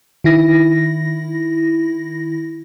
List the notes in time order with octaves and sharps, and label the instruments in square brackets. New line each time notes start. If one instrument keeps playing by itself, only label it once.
[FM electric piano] D#3 E4 A#6